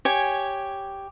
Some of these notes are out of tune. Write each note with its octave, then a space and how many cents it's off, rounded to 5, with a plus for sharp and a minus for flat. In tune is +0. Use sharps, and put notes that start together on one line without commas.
G4 +0 C#5 +0 G#5 -5